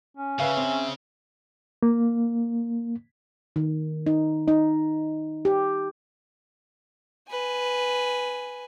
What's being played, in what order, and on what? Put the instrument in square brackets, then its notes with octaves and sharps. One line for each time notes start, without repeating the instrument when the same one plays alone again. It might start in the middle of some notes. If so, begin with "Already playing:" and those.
[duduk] C#4
[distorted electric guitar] C#3 [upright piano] B4 F5 [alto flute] E5
[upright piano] C4
[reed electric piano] A#3
[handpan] D#3
D#4
D#4
G4
[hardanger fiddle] B4 G#5